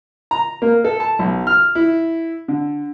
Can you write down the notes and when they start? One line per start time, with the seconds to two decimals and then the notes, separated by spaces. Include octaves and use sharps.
0.31 A#5
0.62 A#3
0.85 A4
1.00 A5
1.19 B1
1.47 F6
1.75 E4
2.48 D3